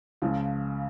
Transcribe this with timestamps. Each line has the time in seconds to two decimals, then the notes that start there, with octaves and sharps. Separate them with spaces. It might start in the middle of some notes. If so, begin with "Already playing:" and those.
0.22 C#2 C#3 F3